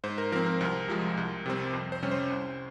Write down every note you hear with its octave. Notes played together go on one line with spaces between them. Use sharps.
G#2 C5
A#4
F3 C4 A#4
A#4
C2 A#4
C3 F3 G#3
C2
C3 G3 C4
F2 C5
C5
C3 G3 C#4
C5
C2